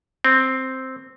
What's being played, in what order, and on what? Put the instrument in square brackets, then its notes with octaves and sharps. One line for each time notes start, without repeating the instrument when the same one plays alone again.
[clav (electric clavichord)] C4